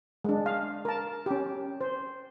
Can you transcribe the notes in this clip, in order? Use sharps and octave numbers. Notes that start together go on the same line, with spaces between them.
G#3 D4
F5
A#4 A5
C#4 G4
C5